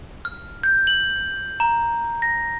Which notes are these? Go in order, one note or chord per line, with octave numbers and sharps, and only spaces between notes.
F6
G6
F#7
A#5
A#6